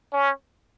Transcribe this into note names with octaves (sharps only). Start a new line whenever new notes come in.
C#4